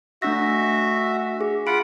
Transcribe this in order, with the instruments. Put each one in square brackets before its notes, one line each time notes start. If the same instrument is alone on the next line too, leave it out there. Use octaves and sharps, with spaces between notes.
[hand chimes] A3 D4 A#6 [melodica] F#4 E5
[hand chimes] G#4
[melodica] F4 F#5 B5 [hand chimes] D7